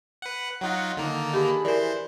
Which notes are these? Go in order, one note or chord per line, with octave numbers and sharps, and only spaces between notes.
B4 F#5
F#3 D#4 F4 F#5
D3 D#3 A#3 D#4
D4 G4 G#4 B5
E3 A#4 C5 D5